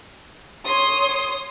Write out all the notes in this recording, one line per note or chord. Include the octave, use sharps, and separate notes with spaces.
C#5 C6 D#6